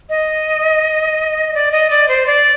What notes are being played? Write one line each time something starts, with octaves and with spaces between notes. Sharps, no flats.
D#5
D5
D#5
D5
C5
D5